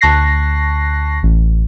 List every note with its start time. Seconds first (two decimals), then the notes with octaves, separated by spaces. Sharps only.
0.01 D2 A5 C#6 F#6 A#6 C7
1.23 A1